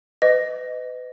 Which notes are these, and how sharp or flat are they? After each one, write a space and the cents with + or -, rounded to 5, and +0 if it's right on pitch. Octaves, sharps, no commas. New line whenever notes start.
B4 +35 D#5 +0